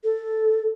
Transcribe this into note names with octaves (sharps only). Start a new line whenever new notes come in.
A4